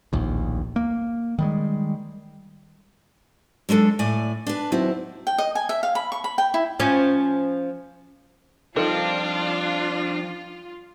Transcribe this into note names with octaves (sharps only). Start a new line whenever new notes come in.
D1 A#1 D#2
A#3
D#3 G3 G#3
F#3 G#3 D4 A4
A2 D5 G#5
D4 B4
D#2 F#3 C4 E4
G5
D#5
G#5
E5
F5
B5
C#6
B5
G5
E4
F3 C#4
F3 G3 C4 D4 D#4 F4 A4 A#4